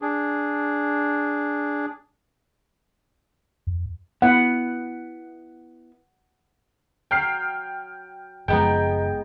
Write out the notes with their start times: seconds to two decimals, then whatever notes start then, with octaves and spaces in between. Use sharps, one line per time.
0.02 D4 G#4
3.67 F2
4.22 B3 E4 F#5
7.11 F#3 G5 F6 C7
8.48 F#1 F3 G#3 B3 D#4 G5